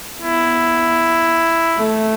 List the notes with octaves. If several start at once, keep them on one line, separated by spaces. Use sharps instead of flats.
B3 E4
A3